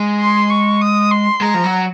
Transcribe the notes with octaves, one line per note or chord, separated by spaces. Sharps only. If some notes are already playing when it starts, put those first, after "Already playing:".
Already playing: G#3
C6
C#6
D#6
C6
G#3 A#5
F3
F#3